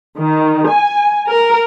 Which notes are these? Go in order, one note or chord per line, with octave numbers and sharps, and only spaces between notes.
D#3
G#5
A#4